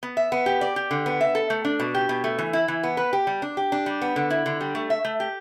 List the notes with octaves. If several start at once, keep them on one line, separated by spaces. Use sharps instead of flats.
B3
E5
B3
G4
D5
G4
D3
B3
E5
A4
A3
D4
B2
G4
B2
A3
E3
E4
E3
B3
B4
G4
G3
D4
G4
D4
G3
B3
D3
E4
D3
G3
A3
E5
A3
G4